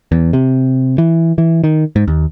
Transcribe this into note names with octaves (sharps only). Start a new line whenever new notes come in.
E2
C3
E3
E3
D#3
G#2
D#2